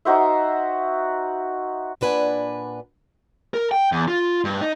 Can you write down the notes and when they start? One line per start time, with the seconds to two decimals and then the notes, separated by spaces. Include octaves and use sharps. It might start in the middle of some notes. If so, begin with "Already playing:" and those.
0.05 D#4 F#4 C5 E5
2.01 A#2 D4 B4 F#5 G#5
3.54 A#4
3.71 G5
3.92 E2
4.08 F4
4.45 G2
4.62 D#4